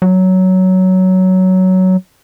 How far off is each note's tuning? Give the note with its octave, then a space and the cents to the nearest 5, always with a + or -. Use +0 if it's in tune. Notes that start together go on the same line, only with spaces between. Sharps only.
F#3 +10